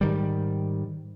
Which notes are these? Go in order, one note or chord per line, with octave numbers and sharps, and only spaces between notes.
G#2 D#3 G3